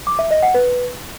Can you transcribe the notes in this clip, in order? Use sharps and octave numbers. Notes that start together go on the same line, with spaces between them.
D6
E5
D#5
F#5
B4